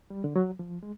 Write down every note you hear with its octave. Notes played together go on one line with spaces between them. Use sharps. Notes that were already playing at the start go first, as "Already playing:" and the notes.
G3
D3
F#3
F3
G#3